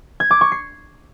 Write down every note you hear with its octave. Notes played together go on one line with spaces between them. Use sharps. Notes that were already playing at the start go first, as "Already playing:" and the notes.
G#6
D6
C#6
C7